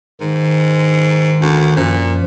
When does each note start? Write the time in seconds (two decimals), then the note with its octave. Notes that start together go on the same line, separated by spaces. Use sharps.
0.21 G#2 D#3
1.41 D2
1.77 F#2 A#2 F3